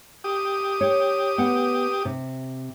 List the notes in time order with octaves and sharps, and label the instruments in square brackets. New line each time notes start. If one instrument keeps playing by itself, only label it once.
[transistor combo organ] G4 D#6
[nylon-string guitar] C#5
B3 F#5
C3